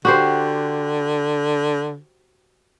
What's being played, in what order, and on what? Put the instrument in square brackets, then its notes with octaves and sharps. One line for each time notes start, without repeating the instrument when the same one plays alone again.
[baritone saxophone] D3 [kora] F#4 G4 C5